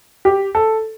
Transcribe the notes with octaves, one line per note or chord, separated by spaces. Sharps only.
G4
A4